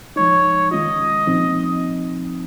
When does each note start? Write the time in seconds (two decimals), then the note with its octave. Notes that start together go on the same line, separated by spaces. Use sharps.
0.16 F3 G#3 D#4 C#5
0.71 D#3 G#3 C#4 F4 D#5
1.27 A#2 F3 C4 D#4